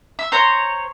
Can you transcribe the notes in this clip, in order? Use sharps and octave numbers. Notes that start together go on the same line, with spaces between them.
E5
C5 C#5 A#5